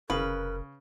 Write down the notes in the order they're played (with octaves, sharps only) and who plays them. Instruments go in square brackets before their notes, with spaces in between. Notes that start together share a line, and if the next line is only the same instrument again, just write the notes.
[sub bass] F1 [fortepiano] C#3 [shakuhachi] A#4 [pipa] B4